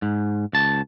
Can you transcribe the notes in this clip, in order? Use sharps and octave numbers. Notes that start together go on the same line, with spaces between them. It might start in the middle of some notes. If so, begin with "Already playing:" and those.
G#2
C#2 A5